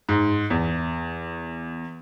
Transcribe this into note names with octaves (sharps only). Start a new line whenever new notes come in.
G#2
E2